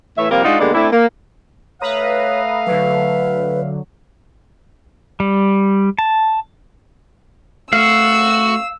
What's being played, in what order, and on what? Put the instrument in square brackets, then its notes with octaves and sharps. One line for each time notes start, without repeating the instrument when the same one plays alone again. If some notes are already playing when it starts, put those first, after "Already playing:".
[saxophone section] A2 E3 C#5 E5
C3 F3 G3 A#3 F4 A#4
G#3 D4 D#4 F4 F#4
B2 D3 G3 G#3 A#3 D5
A3 C4 D4 E4
A#3
[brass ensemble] A3 E5 F5 [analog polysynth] B4 A#5 D#6 [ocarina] C#5
[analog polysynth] D3 F#3 [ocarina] B4
[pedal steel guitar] G3
A5
[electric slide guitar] A3 [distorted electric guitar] F#4 [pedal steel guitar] F5 [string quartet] E6